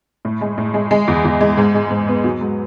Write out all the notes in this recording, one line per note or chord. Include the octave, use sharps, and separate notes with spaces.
A2
G#3
A2
G#3
G#3
E2
E2
G#3
G#2
G#3
G#2
B3
F#3
G#2